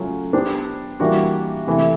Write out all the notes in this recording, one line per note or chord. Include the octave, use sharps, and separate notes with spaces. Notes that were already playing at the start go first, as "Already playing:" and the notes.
Already playing: C#3 F#3 A3 C#4 F4
B3 D4 G4 C5
E3 G3 A#3 D4 F#4
C3 E3 A3